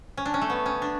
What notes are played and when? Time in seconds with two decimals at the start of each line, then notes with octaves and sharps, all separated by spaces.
0.17 C#4
0.26 D4
0.34 C#4
0.41 A3
0.50 B3
0.66 C#4
0.82 D4